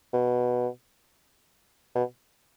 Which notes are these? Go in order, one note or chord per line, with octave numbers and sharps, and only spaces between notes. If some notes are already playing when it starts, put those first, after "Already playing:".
B2
B2